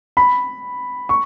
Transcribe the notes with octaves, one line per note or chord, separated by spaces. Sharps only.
B5
C#6